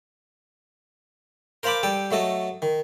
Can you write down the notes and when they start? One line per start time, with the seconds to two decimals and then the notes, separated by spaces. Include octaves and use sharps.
1.63 A#4 C5 F5 A5 B5 D6
1.83 G3 A4 G5
2.11 F#3 A3 A4 D#5
2.62 D#3